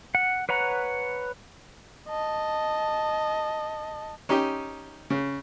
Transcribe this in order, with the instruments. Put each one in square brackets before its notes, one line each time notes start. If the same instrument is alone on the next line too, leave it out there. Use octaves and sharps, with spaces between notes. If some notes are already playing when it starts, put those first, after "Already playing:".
[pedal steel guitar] F#5
B4 C#5 F#5 A#5
[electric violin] D#5 A5
[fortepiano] C#4 D#4 G4
C#3